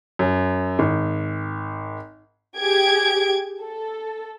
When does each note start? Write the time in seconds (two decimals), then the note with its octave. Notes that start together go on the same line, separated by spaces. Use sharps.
0.19 F#2
0.79 G#1
2.57 G4 G#4 G#6 D7
3.61 A4